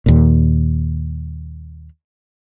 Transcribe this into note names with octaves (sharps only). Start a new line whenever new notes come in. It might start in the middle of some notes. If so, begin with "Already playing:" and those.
D#2 A#2